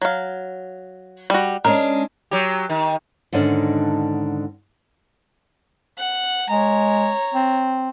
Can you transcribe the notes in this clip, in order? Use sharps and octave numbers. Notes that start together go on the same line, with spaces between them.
F#3 F5
G3 F#4
G#3 C#4 D4 A#4
F#3 G4
D#3
G#2 D3 D#3 C#4 D4
F#5
G#3 C#5 A#5
C4